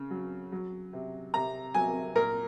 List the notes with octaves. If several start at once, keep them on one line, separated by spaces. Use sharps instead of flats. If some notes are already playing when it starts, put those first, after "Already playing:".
Already playing: C#3
F#3
F#3
C3
C3 A#5
F#3 G#5
A#2 A#4